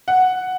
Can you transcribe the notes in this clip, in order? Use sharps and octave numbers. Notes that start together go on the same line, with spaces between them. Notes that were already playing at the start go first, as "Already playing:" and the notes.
F#5